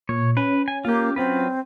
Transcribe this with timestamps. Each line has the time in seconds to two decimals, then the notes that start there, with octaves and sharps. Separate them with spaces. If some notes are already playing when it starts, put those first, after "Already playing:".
0.09 A#2 C#5
0.37 C#4 B4
0.68 G#5
0.85 A#3 F4 G4
1.16 F#3 C4 F4 B4